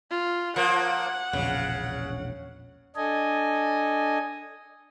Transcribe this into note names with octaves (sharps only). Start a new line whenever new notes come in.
F4
F3 A#3 F#5
E1 A#1 C#3
D4 A4 D#5 G#5